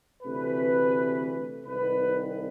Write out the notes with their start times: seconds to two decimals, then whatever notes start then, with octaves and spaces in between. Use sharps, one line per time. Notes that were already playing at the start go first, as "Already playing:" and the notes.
0.23 D2 C3 E3 A3 B4
1.66 C2 C3 D#3 G#3 B4